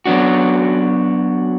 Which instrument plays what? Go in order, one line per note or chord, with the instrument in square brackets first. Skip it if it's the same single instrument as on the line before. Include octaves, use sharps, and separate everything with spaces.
[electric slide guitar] F#3 B3 D4 F#4